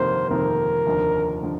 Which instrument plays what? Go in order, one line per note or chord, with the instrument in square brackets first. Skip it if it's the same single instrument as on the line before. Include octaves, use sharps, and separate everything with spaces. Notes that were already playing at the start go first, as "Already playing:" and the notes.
Already playing: [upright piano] G1 F2 C3 D#3 A#3 [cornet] C5
[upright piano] G1 F2 C3 D#3 A#3 [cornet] A#4
[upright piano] F1 D#2 D3 F3
D3 F3